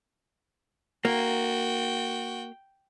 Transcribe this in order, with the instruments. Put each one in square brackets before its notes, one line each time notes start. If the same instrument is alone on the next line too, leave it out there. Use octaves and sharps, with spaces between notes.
[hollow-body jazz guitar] A#3 [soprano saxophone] F#4 [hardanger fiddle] G5